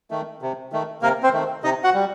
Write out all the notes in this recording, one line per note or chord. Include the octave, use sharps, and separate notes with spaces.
D#3 A3
C3
D#3 A3
C3 A#3 A#4
C4 C5
D#3 A3
C3 D#4 D#5
F#4 F#5
G3